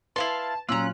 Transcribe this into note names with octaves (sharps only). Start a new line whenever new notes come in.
E4 B4 F5 A5 C6
A#2 F#3 C#4 F4 A#5 E6 F#6